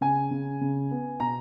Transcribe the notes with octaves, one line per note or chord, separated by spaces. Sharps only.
C#3 G#5
C#3
C#3
B3
B2 A#5